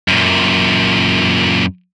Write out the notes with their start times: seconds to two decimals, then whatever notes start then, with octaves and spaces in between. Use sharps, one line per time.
0.08 F#2 A#2